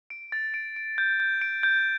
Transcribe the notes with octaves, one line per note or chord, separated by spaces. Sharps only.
D7
A6
D7
D7
G6
G6
D7
G6